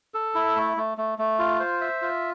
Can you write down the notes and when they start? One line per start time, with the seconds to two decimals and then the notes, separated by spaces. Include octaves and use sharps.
0.14 A4
0.35 E4
0.56 A3
0.77 A3
0.98 A3
1.18 A3
1.39 F4
1.60 C5
1.81 E5
2.02 F4